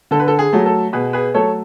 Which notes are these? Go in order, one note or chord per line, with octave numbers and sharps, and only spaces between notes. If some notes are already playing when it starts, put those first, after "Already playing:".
D3 A4
B4
A4
G#4
F#3 A3
A4
B2 G#4 B4
G#4 B4
F#3 A3 A4 C#5